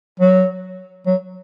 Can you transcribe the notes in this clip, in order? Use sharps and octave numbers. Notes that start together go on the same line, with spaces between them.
F#3
F#3